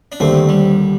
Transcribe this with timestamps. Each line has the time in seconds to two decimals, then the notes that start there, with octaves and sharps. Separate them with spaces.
0.12 D4
0.20 D#2 D3 G3 A3 C4
0.49 G3